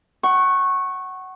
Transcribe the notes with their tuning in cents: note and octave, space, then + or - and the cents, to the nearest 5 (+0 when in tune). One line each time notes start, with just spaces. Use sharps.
F#5 +20 C#6 -15